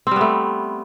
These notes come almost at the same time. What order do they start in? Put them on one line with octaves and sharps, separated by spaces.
C4 G3 B3 A3